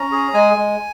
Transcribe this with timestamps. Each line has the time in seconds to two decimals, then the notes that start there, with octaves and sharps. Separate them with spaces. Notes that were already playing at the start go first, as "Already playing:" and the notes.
Already playing: C#4 A#5
0.12 G#4
0.34 G#3 G#5
0.57 G#3